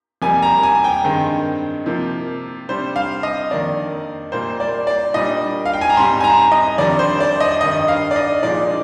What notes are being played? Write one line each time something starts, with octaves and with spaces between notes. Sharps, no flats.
F2 C3 G3 A#3 G#5
A#5
G#5
G5
G2 D#3 G#3 C4
C3 F3 A#3
C3 G3 D4 C5
F5
D#5
F2 D#3 A#3 D4 D5
A#2 G3 A#3 C5
D5
D5
A#2 G3 D4 D#5
F5
G5
G#5
A#5
G#2 G3 C4 C6
G#5
A#5
D#5
F2 D#3 G3 D4 D5
C5
D5
D#5
G2 D#3 G3 D#5
F5
D5
D#5
A#2 F3 G#3 D4 D5